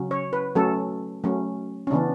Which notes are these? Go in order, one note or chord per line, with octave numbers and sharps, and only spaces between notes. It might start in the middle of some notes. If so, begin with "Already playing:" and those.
Already playing: C#3 F#3 C#4
C#5
B4
F#3 A3 C#4 A4
F#3 A3 C#4
C#4
C#3 E3 B3 D4